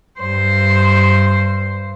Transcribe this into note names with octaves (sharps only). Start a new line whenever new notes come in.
G2 C5